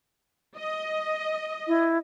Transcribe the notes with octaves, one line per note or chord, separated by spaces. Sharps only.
D#5
E4